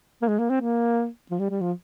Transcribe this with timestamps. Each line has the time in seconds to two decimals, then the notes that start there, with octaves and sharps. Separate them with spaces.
0.22 A#3
0.28 G#3
0.39 A#3
0.50 C4
0.61 A#3
1.31 F3
1.39 G3
1.50 G3
1.61 F3